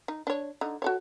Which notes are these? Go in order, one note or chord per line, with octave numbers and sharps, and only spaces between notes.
D#4
D4 C#5
D3 D#4
F#4 A4 C#5